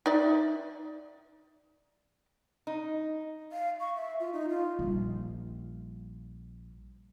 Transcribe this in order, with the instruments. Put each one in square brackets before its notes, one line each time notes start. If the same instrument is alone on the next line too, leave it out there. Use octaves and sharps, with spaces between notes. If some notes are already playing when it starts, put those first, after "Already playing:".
[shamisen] D#4 D5 E5
[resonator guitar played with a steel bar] D#4
[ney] F5
C#6
E5
F4
D#4
F4
[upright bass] A#1 G3